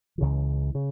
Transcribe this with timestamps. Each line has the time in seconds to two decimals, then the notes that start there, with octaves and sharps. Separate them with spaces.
0.18 C#2 C#3 E3
0.75 C#3